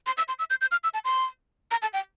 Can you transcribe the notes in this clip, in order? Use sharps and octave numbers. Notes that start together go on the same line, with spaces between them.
C6
E6
C6
E6
G6
G6
F6
E6
A5
C6
A#5
A5
G5